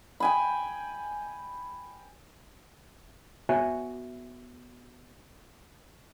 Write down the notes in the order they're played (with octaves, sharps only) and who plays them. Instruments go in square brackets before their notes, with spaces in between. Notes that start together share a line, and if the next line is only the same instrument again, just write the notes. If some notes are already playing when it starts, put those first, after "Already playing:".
[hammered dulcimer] G5 G#5 B5
[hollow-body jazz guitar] B3 F#4 C#5 E5 G#5